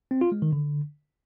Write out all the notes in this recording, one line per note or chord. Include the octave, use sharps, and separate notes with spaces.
C4
F4
G#3
D#3
D3